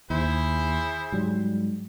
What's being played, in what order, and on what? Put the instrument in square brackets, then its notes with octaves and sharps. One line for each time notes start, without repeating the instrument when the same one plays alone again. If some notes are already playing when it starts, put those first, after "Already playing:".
[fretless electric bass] D#2 [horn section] E4 G#4 C5
[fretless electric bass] G#2 F#3 G3